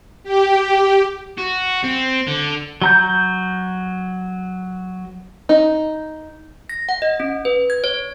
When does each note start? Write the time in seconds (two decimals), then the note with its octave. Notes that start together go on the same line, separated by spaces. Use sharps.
0.23 G4
1.38 F#4
1.84 C4
2.27 D3
2.82 F#3 A#5 G6
5.49 D#4
6.69 A#6
6.89 F#5
7.02 D#5
7.20 C#4
7.45 B4
7.70 G#6
7.84 C#5